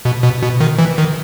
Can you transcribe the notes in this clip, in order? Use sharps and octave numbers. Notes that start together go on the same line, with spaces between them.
B2
B2
B2
D#3
E3
D#3